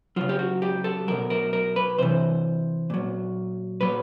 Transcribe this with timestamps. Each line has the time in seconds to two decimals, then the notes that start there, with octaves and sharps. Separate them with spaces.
0.16 C#3 F#3 F4
0.29 G4
0.39 F#4
0.62 G4
0.84 A4
1.08 B2 F#3 A#4
1.30 A#4
1.53 A#4
1.76 B4
1.98 C3 E3 C5
2.90 A#2 F#3
3.81 A#2 F#3 B4